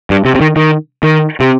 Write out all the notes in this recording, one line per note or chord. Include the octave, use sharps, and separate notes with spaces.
G2
C3
C3
D#3
D#3
D#3
C3